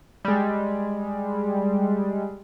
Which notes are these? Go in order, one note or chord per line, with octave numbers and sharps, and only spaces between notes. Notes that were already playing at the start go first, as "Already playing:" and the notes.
G3 G#3